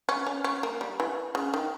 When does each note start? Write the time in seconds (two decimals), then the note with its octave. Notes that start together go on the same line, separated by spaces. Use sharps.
0.09 C#4
0.27 C#4
0.44 C#4
0.63 A#3
0.81 G3
1.00 E3
1.35 C#3
1.54 D#3